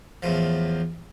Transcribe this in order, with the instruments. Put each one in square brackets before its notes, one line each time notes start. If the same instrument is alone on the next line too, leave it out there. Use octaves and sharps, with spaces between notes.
[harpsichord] E2 A2 F3